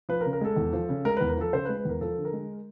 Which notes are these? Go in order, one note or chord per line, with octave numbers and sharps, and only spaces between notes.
F3 B4
A#4
C#3
A#4
G#3 A4
E2
F3
C#3
G#3 A#4
E2 B4
A#4
F3 A4
C#3 C5
B4
G#3
B4
E2 A#4
F3 A4
D3
A#4
G#3